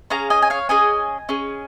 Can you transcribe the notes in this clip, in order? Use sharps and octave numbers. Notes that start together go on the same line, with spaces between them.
C#4 G#4 F5 A#5
D#5 G#5
G#5
C#5 F5
C#4 G#4 D#5 G#5
C#4 G#4